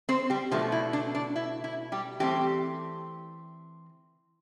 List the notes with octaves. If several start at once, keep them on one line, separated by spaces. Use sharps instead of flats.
C4 C5
G3 G4
B2 F3 A3 D4 F4
E4
D4
D4
E4
E4
G3 G4
E3 G3 A3 C4 G4